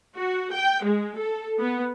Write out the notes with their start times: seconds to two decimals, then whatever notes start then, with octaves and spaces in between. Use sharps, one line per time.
0.15 F#4
0.52 G5
0.82 G#3
1.17 A4
1.60 B3